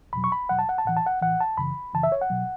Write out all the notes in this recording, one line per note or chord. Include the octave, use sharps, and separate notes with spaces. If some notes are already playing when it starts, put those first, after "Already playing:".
E2 B2 F#3 B5
C#6
B5
E2 B2 F#3 F#5
A5
F#5
A5
A2 E3 F#5
A5
F#5
A2 E3 F#5
A5
F#2 C#3 E3 B5
F#2 C#3 E3 A5
E5
C#5
F#5
B2 F#3